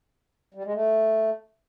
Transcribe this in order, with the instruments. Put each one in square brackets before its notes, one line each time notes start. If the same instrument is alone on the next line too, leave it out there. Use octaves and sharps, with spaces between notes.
[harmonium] G3
G#3
A3